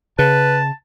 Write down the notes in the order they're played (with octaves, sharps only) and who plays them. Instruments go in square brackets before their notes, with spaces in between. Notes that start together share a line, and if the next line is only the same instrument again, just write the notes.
[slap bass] C#3 [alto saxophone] B4 [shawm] A5